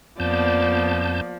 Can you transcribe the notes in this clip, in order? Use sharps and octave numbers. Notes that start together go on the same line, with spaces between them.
F2 F3 A#3 B3 D5 A5 G6